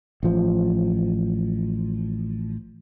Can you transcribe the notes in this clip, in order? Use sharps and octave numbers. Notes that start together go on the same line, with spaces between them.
A1 F3